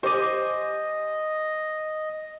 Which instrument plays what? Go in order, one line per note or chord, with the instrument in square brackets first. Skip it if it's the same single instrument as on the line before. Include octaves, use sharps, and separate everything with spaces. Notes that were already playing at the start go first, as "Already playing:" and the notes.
[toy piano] G4 D6 [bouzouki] C5 G#5 [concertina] D#5